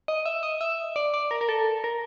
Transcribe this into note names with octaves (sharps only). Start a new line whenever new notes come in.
D#5
E5
D#5
E5
D5
D5
A#4
A#4
A4
A#4